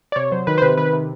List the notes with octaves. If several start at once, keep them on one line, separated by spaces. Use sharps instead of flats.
D5
C3 C#5
F#3 C5
D#3 B4
C5
C3 B4
D#3 B4
C3